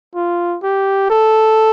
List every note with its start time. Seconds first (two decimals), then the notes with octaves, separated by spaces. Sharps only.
0.15 F4
0.63 G4
1.10 A4